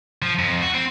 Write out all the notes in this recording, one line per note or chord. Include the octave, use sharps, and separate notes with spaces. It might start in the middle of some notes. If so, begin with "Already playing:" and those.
F3
F2
F#4
C4